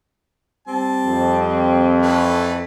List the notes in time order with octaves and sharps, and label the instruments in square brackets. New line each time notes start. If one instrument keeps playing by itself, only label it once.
[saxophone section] G3 C4 [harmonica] A5
[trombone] F2
[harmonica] E3 A3 B4